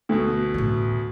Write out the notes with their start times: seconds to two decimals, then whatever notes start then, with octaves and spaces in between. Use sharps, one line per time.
0.09 D2 B2 A3
0.54 A1 D3